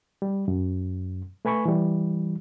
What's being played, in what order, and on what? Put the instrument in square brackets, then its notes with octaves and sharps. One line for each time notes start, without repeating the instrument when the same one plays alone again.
[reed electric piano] G3
F#2
A3 B4 G#5 B5 C#6
E3 G3